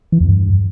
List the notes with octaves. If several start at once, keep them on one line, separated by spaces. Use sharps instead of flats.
E3
E2
G2